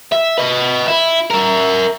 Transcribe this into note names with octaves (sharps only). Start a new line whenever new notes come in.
E5
B4 D#5
E4
A#4 E5